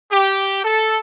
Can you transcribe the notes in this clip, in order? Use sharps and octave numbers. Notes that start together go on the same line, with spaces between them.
G4
A4